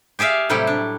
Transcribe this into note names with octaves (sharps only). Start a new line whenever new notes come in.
G4 G#4 D5 E5 F5
A2 C3 F#3 G3 E4 G4
D4